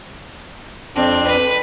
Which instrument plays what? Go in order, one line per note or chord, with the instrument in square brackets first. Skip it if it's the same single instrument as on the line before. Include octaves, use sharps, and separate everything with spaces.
[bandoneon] F2 D4 [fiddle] C4
[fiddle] B4